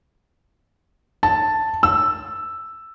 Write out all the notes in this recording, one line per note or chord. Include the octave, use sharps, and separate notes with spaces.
A5
E6